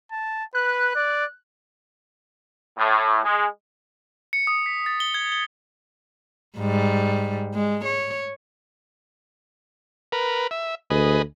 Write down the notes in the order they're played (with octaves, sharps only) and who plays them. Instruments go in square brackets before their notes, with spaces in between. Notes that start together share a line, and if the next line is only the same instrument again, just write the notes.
[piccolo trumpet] A5
[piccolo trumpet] B4 [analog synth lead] F#6
[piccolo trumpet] D5
[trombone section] A2
G#3
[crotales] C#7
D#6
B6
A6
G7
G#6
G7
[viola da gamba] G#2 G3
G#3
C#5
[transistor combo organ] A#4 B4
E5
[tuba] D2 [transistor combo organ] G#4 B4 D#5